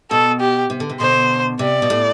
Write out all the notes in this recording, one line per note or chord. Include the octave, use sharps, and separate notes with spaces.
B2 A4
G4
C3
D3
C3
B2 D3 C5
C3 D5
B2
A2